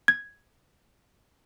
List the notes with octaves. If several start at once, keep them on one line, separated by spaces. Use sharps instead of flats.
G#6